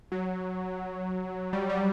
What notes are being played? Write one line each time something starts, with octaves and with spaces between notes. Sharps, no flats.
F#3
G3
G3